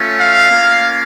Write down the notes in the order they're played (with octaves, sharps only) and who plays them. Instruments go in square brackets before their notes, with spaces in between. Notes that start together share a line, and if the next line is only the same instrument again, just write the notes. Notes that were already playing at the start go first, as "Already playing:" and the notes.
Already playing: [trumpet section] A3 C#4 F4
F5
A#3 C#4 F4